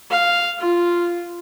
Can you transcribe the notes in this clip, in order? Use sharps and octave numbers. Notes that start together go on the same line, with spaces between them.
F5
F4